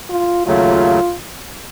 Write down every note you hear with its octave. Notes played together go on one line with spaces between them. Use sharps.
F4
D#2 C#3 F#3 A3 F4